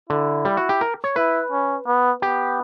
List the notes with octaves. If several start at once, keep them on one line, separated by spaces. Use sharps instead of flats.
D3 E4
G3
F#4
G4
A#4
C#5
E4 B4
C#4
B3
B3 G4